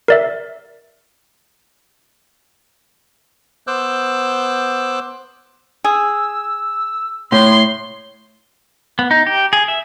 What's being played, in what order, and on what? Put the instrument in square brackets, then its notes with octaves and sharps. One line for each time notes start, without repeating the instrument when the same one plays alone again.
[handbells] A#4 D5 E5
[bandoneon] B3 C5 D6 E6 F#6 G6
[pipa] G#4 [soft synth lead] E6
[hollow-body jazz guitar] A2 [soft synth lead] C#5 [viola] C6
[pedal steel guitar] B3
D#4
G4
G#4
E5